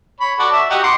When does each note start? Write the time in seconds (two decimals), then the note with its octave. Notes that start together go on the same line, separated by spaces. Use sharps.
0.20 C#5 B5
0.39 F#4 A4 D5
0.53 E5
0.70 D#4 F#4 G4
0.83 F#5 C6 D6